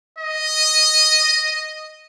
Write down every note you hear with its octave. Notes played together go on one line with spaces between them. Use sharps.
D#5